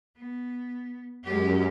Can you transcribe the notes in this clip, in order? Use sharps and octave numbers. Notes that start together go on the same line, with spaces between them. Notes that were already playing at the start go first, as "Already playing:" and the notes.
B3
F#2 G#3 G4